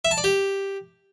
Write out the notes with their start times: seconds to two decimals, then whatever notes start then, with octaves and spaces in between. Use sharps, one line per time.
0.05 E5
0.11 A5
0.18 D5
0.24 G4